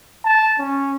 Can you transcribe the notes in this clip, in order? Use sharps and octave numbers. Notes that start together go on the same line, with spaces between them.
A5
C#4